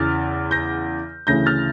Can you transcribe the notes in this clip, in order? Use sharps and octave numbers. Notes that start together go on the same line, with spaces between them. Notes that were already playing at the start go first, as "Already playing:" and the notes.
Already playing: E2 C#3 E3 F6 A6
G6 A#6
D2 C#3 E3 G6 A#6
F6 A6